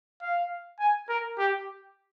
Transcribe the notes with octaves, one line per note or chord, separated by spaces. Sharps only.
F5
G#5
A#4
G4